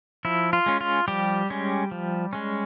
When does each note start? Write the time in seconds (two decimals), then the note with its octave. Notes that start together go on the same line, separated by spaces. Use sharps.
0.25 F3 E4
0.53 F4
0.66 G#3 C#4
0.81 F4
1.08 F3 G3 G4
1.50 G#3 C#4
1.91 F3
2.33 G#3 C#4